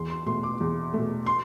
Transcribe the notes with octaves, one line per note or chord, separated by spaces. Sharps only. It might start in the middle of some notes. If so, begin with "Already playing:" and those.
Already playing: E2 C6
C6
B2 A3 C6
D6
E2
B2 A3
C6